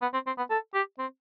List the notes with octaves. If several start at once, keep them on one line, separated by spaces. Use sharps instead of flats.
B3
C4
C4
B3
A4
G4
C4